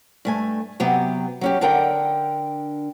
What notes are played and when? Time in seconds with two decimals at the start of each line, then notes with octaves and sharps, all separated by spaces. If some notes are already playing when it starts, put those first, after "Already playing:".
0.25 G2 A3 G#5
0.80 C3 F#3 B3 G4
1.41 F#3 C#4 G4
1.61 D3 D4 A#4 F#5 G5